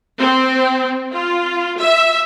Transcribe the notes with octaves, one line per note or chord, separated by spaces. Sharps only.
C4
F4
E5